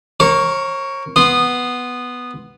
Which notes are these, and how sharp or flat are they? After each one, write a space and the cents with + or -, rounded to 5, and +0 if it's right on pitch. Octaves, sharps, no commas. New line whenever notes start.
A#4 +0 C#5 -40 C#6 +10
B3 +0 C6 +0 D#6 -20